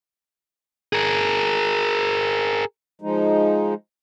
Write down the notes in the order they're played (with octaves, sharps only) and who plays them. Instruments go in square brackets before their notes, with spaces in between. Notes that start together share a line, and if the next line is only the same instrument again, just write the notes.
[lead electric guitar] G#4 A#4
[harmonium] F3 G#3 D#4